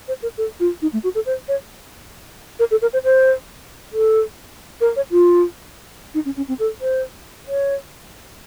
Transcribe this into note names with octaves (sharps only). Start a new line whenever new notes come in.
C5
A#4
A4
F4
D#4
A3
F#4
A4
C5
C#5
A#4
A4
A#4
C5
C5
A4
A#4
C#5
F4
D#4
C#4
C#4
C4
A4
C5
C#5